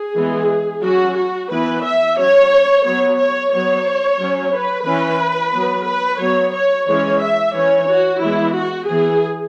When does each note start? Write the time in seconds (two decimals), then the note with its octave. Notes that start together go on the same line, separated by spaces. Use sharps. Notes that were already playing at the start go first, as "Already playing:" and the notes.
Already playing: G#4
0.16 E3 G#3 B3
0.83 F#3 C#4 F#4
1.17 F#4
1.50 E3 B3 B4
1.84 E5
2.17 F#3 C#4 C#5
2.84 F#3 B3 C#5
3.18 C#5
3.52 F#3 B3 C#5
4.19 F#3 C#4
4.52 B4
4.86 E3 C#4 B4
5.53 F#3 B3
5.86 B4
6.20 F#3 B3 C#5
6.54 C#5
6.87 E3 G#3 C#4 C#5
7.21 E5
7.54 E3 C#4 C#5
7.89 F#4
8.21 E3 G#3 B3 E4
8.56 F#4
8.89 E3 B3 G#4